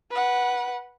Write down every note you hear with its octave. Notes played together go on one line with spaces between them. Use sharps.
B4 F#5